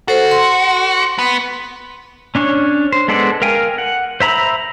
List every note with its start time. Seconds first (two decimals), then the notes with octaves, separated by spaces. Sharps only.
0.08 F#4 A4 C5
0.31 C6
1.18 B3
2.35 C#4 D4 C#5
2.92 C5
3.08 G#3 B3 A4 C5 D5
3.42 A#4 F5 G5 G#5
3.78 F#5
4.20 C5 E5 A#5 B5 E6